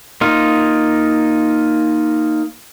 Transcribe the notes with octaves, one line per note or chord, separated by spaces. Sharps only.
A#3 D#4 F4